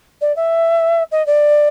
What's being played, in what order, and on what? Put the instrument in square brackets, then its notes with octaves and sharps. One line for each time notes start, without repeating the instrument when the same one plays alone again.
[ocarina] D5
E5
D#5
D5